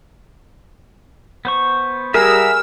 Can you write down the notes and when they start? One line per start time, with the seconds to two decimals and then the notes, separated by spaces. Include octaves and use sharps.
1.45 B3 C5 C#6
2.14 G3 G#4 A#4 E5 F#5 A#5 E6